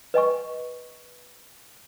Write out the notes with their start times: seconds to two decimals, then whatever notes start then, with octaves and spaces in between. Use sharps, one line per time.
0.14 B4 D#5 G#5 C#6